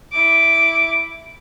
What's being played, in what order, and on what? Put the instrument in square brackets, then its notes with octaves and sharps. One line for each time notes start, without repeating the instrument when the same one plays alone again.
[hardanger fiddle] E4 D6